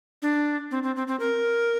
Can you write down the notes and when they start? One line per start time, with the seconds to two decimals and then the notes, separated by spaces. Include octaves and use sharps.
0.22 D4
0.71 C4
0.83 C4
0.96 C4
1.08 C4
1.20 A#4